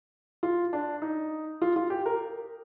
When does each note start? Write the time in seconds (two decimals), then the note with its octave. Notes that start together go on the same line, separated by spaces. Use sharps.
0.43 F4
0.73 D4
1.02 D#4
1.62 F4
1.76 F4
1.90 G4
2.06 A#4